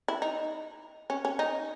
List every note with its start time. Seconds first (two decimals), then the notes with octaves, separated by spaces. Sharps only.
0.08 E4
0.22 D#4
1.10 C#4
1.25 C#4
1.39 D#4